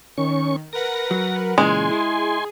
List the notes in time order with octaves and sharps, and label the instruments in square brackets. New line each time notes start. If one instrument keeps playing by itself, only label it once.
[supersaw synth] D#3 [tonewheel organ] C#4 C#6
[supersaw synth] A#4 B4 F#5 [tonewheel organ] A#6
[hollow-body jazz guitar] F#3
[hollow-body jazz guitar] A#2 C#3 E3 [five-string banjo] G#3 [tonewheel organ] G#5 C6
[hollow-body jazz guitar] E4 [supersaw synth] G#4